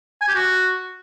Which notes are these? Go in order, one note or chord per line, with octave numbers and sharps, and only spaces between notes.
G#5
G4
F#4